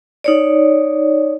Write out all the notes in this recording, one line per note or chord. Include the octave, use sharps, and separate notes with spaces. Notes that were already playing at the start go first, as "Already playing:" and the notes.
D#4 C#5 D5